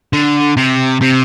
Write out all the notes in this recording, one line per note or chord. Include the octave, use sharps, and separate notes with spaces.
D3
C3
C3